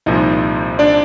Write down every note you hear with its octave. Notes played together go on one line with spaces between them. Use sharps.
C2 A#2 F3 D#4 D#5
D4 D5